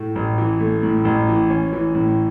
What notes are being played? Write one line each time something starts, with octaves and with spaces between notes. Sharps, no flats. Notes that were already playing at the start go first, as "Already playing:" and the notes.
Already playing: A2 A3
A1
E3
A3
A2
A1
E3
C#4
E3
A2